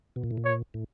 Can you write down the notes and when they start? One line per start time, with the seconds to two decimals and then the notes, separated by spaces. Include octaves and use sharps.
0.16 B2
0.24 A#2
0.31 A2
0.37 A#2
0.45 C#5
0.74 A2